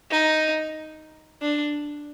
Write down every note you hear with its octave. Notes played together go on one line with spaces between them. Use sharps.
D#4
D4